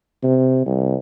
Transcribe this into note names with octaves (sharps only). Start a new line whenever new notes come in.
C3
C2